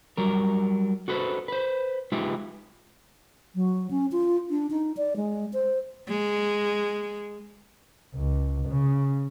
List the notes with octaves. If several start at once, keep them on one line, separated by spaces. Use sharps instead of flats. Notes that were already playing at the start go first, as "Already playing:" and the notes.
F#3 G3 A#4
F#4 A4 B4 C5
B4 C5
G#3 D#4 F4 G4 B4 E5
F#3
C#4
F4
D4
D#4
D5
G#3
C5
G#3
C#2
C#3